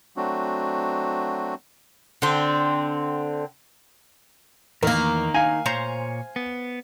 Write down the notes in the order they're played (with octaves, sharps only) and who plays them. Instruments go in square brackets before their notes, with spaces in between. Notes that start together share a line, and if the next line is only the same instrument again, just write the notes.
[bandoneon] F#3 A3 C4 D4 F#4
[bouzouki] D3 C4
[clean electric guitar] E2 [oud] D#3 A#3 [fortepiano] A#4
[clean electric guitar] D#4 [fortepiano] F5 G#5
[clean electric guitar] A#2 C#5 A#5 [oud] C5
[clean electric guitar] B3